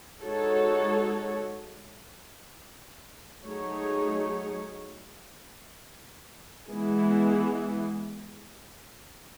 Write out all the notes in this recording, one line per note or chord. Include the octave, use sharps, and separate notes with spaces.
G#3 D#4 F#4 A4 C#5
F#3 A3 D#4 G#4 C#5
E3 G#3 B3 E4 G#4